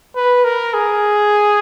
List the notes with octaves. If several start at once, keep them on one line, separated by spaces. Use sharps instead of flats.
B4
A#4
G#4